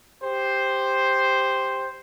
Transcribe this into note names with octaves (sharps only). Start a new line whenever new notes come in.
G4 C5